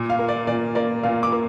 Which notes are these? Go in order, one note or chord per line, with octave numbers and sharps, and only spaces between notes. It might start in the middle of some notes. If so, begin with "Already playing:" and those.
Already playing: A#2
F5
A#3
D5
A#2 D5
A#3 D5
A#2 F5
D6
A#3